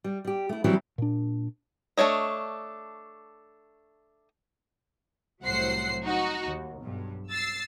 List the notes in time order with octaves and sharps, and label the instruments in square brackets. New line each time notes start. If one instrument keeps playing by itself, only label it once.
[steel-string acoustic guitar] G3
G3 G4
A3 E4
E3 F#3 G3 C4 D4 E4
[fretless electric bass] A#2 D4
[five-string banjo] A3 D4 C#5 D#5
[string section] C2 A2 F#3 C5 F#5 C7
D#4 F#4
D#2
B1 G2
E6 A6 C7